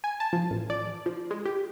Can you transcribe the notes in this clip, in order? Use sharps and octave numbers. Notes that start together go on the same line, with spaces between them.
G#5
A5
F3
A1
D5
F3
G#3
G4